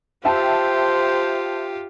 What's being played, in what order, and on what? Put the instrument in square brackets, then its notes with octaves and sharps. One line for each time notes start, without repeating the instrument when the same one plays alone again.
[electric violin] F4 G4 [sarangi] C5 [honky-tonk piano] E5 G5 A5